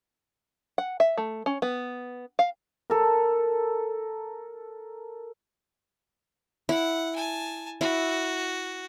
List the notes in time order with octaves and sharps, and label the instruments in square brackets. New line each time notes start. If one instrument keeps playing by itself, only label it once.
[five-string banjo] F#5
E5
A3
C#4
B3
F5
[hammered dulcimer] A4 A#4
[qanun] E4 [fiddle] F#5
[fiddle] G#5 A5
[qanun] E4 [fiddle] F#4